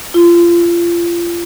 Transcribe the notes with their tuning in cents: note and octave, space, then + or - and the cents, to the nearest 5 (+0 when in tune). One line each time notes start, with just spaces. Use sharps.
F4 -30